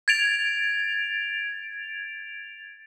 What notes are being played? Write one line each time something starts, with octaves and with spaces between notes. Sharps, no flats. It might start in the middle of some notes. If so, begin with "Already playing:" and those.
G#6 A6 D7 F7